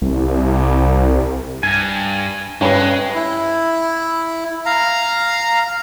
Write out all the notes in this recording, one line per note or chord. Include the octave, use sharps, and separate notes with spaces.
C2
G2 G#5
G2 G#3 C#4 B4
E4
F5 A#5